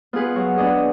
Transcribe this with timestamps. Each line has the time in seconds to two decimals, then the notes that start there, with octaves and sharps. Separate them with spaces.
0.13 B3 F4 G#4 B4
0.36 F#3
0.57 B3 D4 G#4 D#5